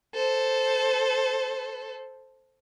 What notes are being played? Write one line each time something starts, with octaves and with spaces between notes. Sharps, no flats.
A4 C5